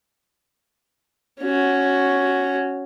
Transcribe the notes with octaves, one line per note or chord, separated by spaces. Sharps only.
C#4 F#4